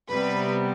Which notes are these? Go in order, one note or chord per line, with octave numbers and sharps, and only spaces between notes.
C3 G3 B3 B4